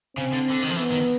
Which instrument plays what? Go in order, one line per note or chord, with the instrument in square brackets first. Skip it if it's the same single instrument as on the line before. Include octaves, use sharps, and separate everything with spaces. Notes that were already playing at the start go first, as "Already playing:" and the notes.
[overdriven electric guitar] C#3 [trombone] C4
[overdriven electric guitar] D3
D3
D#3
F3
[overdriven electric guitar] E3 [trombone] B3
[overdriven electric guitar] D#3